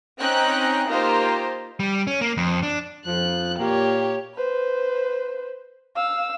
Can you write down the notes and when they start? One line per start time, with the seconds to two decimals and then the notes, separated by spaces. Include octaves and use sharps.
0.20 C4 C#4 D#4 D#5 G5 F#6
0.88 A#3 D#4 F4 G4 C5
1.80 G3
2.07 C#4
2.21 A#3
2.37 F2
2.63 D4
3.06 F2 F3 F#6
3.58 A#2 A#3 G4 C#5
4.35 B4 C5
5.96 F5 E6